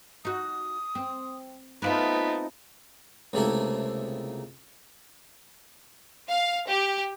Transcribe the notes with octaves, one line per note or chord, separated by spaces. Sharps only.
D#4 F#4 D#6
C4
A3 B3 C4 D#4 F4 B4
C#2 C3 A3 A#3 E4
F5
G4